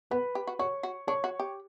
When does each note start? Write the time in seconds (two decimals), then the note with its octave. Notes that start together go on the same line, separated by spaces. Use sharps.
0.11 B3 B4 B5
0.35 G4
0.47 F#4
0.59 F#4 C#5 C#6
0.83 F#4
1.07 D4 C#5 C#6
1.24 F#4
1.40 G4